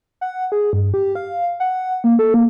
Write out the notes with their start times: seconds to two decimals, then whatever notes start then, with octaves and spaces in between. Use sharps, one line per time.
0.21 F#5
0.52 G#4
0.73 G2
0.94 G4
1.15 F5
1.60 F#5
2.04 A#3
2.19 A4
2.34 A#3